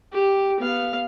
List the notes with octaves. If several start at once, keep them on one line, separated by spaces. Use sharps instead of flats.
G4
B3 F5